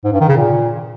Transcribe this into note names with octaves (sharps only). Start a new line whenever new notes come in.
G#2
G2
D#3
C#3
A#2